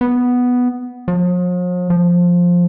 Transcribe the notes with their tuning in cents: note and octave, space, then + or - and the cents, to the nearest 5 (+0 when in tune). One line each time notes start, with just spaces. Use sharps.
B3 +0
F3 +45
F3 +10